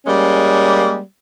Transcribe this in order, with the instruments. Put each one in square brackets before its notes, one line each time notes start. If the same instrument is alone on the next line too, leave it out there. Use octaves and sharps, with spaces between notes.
[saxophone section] G3 G#3 A#3 C#4